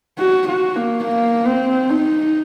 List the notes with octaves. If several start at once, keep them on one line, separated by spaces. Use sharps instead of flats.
F#4
F#4
A#3
A#3
C4
D#4